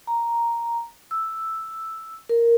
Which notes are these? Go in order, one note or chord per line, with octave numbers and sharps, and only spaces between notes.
A#5
E6
A#4